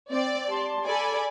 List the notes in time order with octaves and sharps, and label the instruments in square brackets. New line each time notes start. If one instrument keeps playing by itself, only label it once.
[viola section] C4 [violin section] D5
[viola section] G4 A5 C6
[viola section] G#4 A4 [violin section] D5 G#5 B5